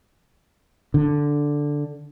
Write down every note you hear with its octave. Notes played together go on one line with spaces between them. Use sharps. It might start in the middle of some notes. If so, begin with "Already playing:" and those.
D3